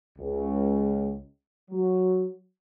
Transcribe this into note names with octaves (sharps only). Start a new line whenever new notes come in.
C#2
F#3